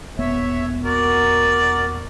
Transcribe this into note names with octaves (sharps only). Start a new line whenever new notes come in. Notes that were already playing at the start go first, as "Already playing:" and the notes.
E1 A#1 B3 C#5 E5
F#4 A#4 D5